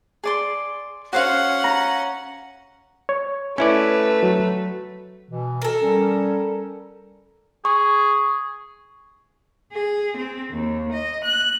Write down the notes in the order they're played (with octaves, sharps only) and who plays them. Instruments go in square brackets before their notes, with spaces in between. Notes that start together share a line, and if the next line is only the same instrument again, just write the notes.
[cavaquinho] G#4 D5 C6
[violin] C#4 F#5 [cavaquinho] F#4 C5 F5
[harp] A#5
[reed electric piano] C#5
[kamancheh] A3 B4 [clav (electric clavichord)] C#4 E4 D5
[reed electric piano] F#3
[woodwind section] B2 E3
[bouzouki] A4 A#4
[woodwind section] G3 C#4
[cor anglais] G#4 [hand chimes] C#6
[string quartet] G#4
C4
D#2
D#5
F#6